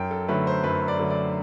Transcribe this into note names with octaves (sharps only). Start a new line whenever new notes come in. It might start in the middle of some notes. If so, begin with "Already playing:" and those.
Already playing: F#2 G5
A4
D3 F#3 A3 B4
C5
F#2 B4
D5
D3 F#3 A3
D5